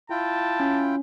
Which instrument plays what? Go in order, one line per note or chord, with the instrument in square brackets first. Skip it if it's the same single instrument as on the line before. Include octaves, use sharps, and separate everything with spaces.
[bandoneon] E4 F4 G5 [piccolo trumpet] A5
[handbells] C#4